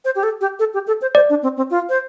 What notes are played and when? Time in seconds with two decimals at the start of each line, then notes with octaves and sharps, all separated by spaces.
0.05 C5
0.15 G4
0.23 A4
0.41 G4
0.59 A4
0.74 G4
0.87 A4
1.02 C5
1.15 C5 D5
1.29 D4
1.43 C4
1.57 C4
1.71 F4
1.89 C5